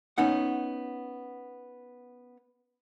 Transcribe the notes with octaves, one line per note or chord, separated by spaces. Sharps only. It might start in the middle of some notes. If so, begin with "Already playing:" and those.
B3 C#4 D#4 F#5